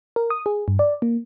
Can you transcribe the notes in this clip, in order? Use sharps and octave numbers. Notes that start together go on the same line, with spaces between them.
A#4
D#6
G#4
G2
D5
A#3